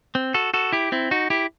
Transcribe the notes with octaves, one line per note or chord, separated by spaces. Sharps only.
C4
F#4 A4
F#4 A4
E4 G4
C4 E4
D#4 F#4
E4 G4